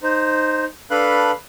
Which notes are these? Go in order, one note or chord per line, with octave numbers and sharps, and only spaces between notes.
D#4 C5
D4 A4 B4 F5 B5 F#6